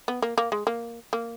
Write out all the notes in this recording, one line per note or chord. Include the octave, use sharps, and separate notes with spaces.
B3
A#3
A#3
G#3
A#3
A#3